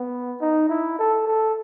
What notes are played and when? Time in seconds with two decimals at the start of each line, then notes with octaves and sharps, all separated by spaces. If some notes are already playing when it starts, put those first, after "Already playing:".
Already playing: B3
0.41 D#4
0.69 E4
0.99 A4
1.27 A4